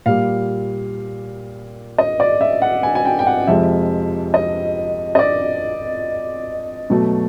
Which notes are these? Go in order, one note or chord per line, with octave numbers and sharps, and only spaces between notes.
A#2 G3 F5
D#5
D5
E5
F#5
G#5
G#5
G5
G5
F#5
F2 C3 F3 G#3 E5
D#5
D#5
D5
B2 F#3 A3